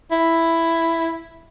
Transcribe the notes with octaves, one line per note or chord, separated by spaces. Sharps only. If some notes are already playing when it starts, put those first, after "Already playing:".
E4